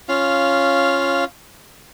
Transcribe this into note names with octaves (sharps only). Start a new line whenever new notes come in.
C#4 F4 F5